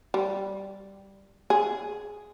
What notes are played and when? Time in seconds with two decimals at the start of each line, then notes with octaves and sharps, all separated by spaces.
0.14 G3
1.50 G#4